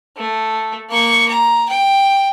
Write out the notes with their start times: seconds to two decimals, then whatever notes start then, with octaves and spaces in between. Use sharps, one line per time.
0.17 A3
0.90 A#3 C#6
1.28 A#5
1.69 G5